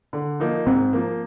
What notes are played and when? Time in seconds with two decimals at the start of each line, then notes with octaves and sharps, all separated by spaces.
0.13 D3
0.40 F3 A#3 D#4
0.66 G#2 C4
0.93 F3 A#3